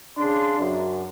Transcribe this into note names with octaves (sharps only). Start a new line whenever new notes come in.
C#3 D4 C6
F#2